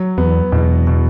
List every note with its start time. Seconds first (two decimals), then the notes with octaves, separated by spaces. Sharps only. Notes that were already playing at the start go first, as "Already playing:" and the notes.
Already playing: F#3
0.18 E2 B3
0.52 E2 B2
0.87 B2